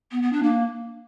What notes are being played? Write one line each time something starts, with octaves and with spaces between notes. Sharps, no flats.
B3
B3
D4
A#3